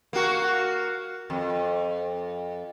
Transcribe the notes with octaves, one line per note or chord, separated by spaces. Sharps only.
A#3 F#4
F2